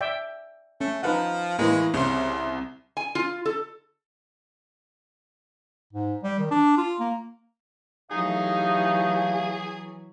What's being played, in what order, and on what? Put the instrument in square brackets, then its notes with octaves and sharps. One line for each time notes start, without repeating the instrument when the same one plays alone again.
[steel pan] D5 E5 G5
[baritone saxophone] A3 [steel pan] C#4
[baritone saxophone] F3 [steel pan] D#4 B4 F#5
[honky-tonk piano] A2 E3 [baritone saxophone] G#3 [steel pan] A#3
[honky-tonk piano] C2 C6 [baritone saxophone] C#3
[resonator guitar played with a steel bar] G#5
F4
A4
[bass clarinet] G#2
G3
D#3
D4
F4
A#3
[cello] E3 F#3 [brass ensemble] A3 G4 F5 [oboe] D#4 [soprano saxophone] G#4